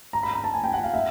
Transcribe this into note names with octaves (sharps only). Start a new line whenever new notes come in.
A#5
B5
A#5
A5
G#5
G5
F#5
F5
E5